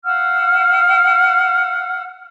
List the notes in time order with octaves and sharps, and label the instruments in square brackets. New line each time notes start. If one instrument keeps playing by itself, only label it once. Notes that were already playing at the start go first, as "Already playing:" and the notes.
[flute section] F5 F#5 E6 F6